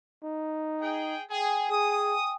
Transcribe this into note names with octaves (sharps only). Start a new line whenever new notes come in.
D#4
G#4 G5
G#4 G5 G#5
G#4 D#6